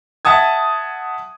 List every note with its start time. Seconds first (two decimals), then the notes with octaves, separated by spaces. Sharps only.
0.25 E5 F#5 A5 D#6 G#6